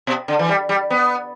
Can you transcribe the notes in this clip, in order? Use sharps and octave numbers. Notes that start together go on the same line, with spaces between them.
B2
D3
E3
G3
G3
B3